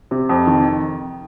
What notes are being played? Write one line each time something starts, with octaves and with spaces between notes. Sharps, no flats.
C3
F2
D#3